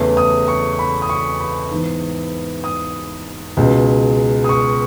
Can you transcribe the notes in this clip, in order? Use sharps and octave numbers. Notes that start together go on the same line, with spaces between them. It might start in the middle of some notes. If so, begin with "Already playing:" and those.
Already playing: E2 C#3 E3 A3 C#4
D#6
C#6
B5
D#6
C#6
B5
G#2 E3 B3
D#6
C#2 B2 G#3
D#6
C#6